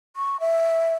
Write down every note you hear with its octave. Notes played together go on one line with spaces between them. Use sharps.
C#6
E5